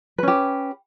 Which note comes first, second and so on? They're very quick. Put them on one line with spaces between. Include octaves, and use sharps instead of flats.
B4 C#4 G4